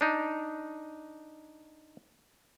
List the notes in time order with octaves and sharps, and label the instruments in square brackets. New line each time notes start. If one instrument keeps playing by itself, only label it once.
[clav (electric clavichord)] D4 D#4